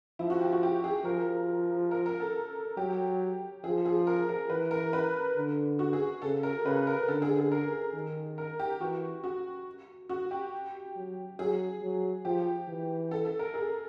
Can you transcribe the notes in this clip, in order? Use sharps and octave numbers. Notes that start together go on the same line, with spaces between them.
F3 E4
F#4
G4
F#4
G4
G#4
F3 A#4
A#4
A#4
A4
F#3 G4
F3 G#4
G#4
A#4
A#4
E3 B4
A#4
B4
D3
F#4
G#4
C#3 A4
A#4
C#3 B4
A#4
D3 A4
G#4
G#4
A#4
D#3
A#4
G4
E3 F#4
F#4
F#4
G4
F#3
F#3 G#4
F#3
F3 G4
E3
A4
A4
A#4
G#4